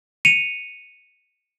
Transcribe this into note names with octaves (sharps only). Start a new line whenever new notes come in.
C#7 D#7 F7